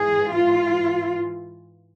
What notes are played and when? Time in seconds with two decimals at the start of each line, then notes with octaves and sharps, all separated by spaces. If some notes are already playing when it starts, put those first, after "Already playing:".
Already playing: G#2 E3 G#4
0.33 F4